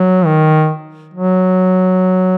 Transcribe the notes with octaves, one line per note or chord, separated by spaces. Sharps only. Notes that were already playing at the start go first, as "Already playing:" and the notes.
Already playing: F#3
D#3
F#3